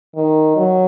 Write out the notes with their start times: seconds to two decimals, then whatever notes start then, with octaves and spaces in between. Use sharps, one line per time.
0.16 D#3
0.56 F#3